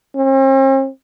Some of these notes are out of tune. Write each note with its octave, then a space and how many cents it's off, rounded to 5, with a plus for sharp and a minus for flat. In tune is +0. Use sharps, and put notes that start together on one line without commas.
C4 +45